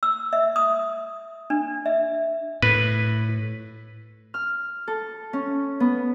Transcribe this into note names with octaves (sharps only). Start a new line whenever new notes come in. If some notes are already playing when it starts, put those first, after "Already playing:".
E6
E5
D#6
D4
E5
A2 B4
F6
A4
C#4
B3